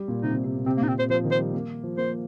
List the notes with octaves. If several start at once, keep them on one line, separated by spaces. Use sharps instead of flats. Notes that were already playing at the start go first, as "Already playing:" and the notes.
Already playing: G3
A#2
C3 D#4
C3
C3
A#2
C3 C4
A#3
A#2 D#4
C4
C3 C5
F3 C5
D#3
C5
G3
A#3
F3
A#3 C5